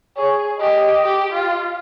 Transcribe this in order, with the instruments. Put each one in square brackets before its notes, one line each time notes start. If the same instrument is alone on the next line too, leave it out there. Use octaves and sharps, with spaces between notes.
[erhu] G#4 [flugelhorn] C#5
[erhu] G4 [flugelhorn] D#5
[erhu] G4
F4